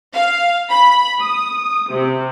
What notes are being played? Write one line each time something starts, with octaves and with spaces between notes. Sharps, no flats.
F5
B5
D#6
C3